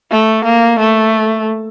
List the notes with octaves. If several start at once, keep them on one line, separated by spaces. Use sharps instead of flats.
A3
A#3
A3